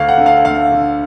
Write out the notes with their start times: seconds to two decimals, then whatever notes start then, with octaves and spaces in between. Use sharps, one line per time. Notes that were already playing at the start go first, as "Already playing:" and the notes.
Already playing: D2 F5
0.09 F#5
0.18 D3
0.26 F5
0.45 D2 F5
0.72 D3